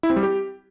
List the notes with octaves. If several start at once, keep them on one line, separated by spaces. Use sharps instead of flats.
E4
C4
G3
G4